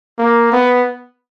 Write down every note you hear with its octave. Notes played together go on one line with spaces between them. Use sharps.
A#3
B3